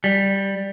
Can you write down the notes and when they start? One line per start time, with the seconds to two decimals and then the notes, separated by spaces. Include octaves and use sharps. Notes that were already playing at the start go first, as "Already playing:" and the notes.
0.04 G3